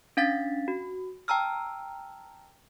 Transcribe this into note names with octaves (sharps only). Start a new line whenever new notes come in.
C#4 D4 F5 A6 B6
F#4
G5 A5 A#5 E6 F6